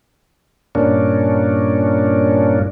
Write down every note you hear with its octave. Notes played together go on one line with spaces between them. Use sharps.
G2 A#2 A#3 C#4 D4